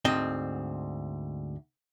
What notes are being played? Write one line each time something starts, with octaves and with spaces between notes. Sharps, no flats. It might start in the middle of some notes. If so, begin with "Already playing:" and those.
D2 G#2 C4 D#5